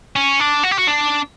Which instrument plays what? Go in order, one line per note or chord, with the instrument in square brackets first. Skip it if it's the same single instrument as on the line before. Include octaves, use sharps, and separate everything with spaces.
[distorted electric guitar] C#4
D4
F#4
G4
F#4
D4